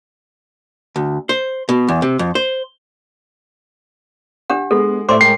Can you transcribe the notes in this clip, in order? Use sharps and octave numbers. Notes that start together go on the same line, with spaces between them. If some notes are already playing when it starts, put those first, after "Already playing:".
D2
C5
B2
E2
C3
F2
C5
D4 G4 F#5
G#3 B3 A4
A2 C5 D5 E5 C6 D6
G#3 A#4 G5 C7